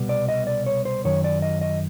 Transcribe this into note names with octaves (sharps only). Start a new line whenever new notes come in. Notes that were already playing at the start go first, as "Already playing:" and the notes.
Already playing: C2 B2 G3 B3
D5
D#5
D5
C#5
C5
F#2 D#3 F#3 C#5
D5
D#5
D#5